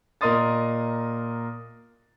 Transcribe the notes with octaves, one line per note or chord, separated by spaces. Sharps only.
A#2 A#4 D#5 C6 D#6 A6